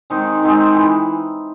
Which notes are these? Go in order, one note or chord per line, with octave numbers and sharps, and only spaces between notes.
D#3 G#3 C4 D#4
D#3 G#3 C4 D#4
E3